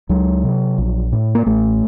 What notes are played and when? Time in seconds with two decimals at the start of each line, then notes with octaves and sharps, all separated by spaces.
0.09 C#2 F#3
0.44 C3
0.78 A#1
1.12 A2
1.35 A#3
1.46 A1 A3